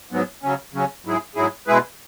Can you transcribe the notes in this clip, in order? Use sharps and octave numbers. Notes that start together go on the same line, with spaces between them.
G#2 F#3 B3
C#3 F#3 C#4
C#3 F#3 C#4
G#2 F#3 E4 G#4
G#2 F#3 E4 G#4
B2 G#3 E4 G#4 B4